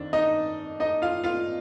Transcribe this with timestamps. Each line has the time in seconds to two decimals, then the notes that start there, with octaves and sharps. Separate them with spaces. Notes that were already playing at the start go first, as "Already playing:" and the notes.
Already playing: F2 D#3 D4
0.13 D#4 D#5
0.80 D#4 D#5
1.02 F4 F5
1.24 F4 F5